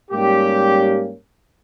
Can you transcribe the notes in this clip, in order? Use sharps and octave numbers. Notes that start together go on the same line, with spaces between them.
G#2 G3 A#3 C#4 G4